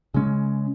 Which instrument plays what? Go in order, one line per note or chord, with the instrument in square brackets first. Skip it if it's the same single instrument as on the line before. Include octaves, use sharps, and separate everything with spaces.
[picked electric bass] C#3 G#3 C#4